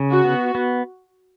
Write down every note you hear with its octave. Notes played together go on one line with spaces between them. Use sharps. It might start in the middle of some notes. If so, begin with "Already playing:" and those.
Already playing: C#3
F#4
B3
B3